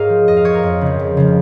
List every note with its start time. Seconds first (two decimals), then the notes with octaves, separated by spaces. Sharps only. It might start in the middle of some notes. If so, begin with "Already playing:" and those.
Already playing: G#2 G#4 A#4 C#5 D#5 F5
0.09 F3
0.27 F2 D#5
0.37 F5
0.45 F3 C#5
0.55 A#4
0.63 F2
0.81 C#3 F3
0.99 F2
1.17 C#3 F3